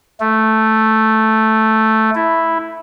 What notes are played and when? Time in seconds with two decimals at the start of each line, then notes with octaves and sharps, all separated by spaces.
0.20 A3
2.15 E4